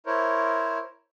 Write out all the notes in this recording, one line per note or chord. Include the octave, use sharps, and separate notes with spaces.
E4 A#4 C5 C#5